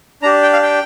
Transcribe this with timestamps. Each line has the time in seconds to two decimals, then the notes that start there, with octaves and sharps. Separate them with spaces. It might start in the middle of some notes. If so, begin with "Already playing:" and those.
0.23 D4 G4 A#5
0.43 G5
0.53 F5
0.63 G5